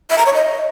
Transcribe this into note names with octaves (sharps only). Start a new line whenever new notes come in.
E5
A#5
C#5
D#5